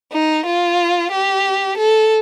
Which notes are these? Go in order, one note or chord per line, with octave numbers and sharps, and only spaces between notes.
D#4
F4
G4
A4